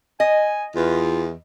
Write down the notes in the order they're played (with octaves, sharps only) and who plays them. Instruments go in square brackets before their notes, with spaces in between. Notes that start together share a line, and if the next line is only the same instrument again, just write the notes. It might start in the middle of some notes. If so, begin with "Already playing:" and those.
[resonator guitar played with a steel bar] D#5 [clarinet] G#5
[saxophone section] E2 [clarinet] F4